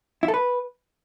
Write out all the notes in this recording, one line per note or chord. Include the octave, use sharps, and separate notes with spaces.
E4
A4
B4